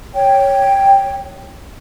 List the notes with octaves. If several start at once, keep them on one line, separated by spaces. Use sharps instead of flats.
C#5 G5